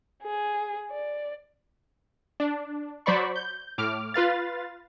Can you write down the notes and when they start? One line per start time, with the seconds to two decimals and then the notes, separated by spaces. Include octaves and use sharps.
0.22 G#4
0.91 D5
2.40 D4
3.06 F#3 C5 D5 B5 C#6
3.36 G6
3.78 A2 D6 F6
4.14 F4 B4 F5 A6